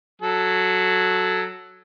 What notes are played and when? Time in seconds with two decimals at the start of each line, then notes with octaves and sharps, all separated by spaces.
0.22 F#3 A4